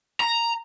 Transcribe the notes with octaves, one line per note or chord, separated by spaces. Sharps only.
A#5